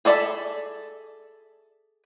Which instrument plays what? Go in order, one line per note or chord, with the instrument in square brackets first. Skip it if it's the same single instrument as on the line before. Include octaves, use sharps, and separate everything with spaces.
[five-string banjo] G#4 A4 D5 E5